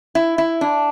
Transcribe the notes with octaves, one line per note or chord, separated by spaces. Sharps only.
E4
E4
D4